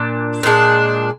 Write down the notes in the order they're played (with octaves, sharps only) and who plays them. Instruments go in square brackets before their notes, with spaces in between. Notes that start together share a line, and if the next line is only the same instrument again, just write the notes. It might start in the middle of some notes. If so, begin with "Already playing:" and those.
Already playing: [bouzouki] A#2 D4
A#2 G#3 D4